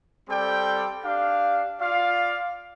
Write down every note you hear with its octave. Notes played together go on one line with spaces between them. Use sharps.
G3 C4 A4 D5 G5
D4 G4 F5
F4 D5 F5